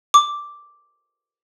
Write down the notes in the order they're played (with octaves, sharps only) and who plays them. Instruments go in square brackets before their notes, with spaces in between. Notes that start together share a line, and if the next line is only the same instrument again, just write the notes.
[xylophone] D6